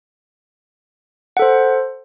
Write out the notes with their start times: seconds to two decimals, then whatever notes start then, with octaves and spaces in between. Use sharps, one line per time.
1.37 F#5
1.39 A4
1.42 C5